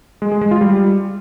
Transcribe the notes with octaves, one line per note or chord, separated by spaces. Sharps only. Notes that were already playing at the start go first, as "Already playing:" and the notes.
G#3
G#4
G#3
F4
G3